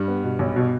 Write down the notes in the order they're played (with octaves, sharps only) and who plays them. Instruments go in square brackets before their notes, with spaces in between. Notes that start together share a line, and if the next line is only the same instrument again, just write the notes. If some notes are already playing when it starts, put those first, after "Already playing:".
Already playing: [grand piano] G2 G3
[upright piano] B3
B2
B1
B2